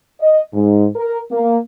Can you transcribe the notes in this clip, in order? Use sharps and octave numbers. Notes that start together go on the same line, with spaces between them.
D#5
G#2
A#4
A#3